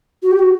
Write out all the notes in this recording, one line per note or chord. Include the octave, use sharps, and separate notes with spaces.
F#4
G4
F#4